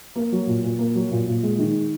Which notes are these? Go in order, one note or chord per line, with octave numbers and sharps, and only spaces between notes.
A#3
F#3
A#2
A#2
A#3
F#3
A#2
A#2
G#3
D#3